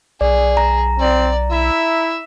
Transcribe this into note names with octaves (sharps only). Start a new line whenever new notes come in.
B1 G#4 D5
A#5
C4 D5
E4 E5